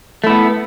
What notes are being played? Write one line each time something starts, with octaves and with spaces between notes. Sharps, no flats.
A3 B3 E4